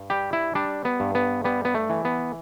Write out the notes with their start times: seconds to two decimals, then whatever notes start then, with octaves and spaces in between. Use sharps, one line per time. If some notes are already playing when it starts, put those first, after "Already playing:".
Already playing: G2
0.10 G3 G4
0.33 E4
0.55 G3 D4
0.85 B3
1.00 G2
1.15 B3
1.44 G3 B3
1.65 B3
1.75 A3
1.90 E3
2.05 B3